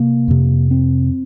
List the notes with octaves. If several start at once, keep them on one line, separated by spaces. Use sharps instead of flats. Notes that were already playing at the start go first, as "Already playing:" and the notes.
Already playing: C3 A#3
F2 C3
C4